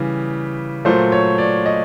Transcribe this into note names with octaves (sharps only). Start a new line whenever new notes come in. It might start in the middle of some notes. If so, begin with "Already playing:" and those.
Already playing: C#3 E3 G3
A#2 F#3 A3 C5
C#5
D5
D#5